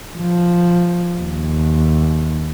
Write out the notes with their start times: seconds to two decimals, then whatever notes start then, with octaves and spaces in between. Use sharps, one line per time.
0.17 F3
1.18 D#2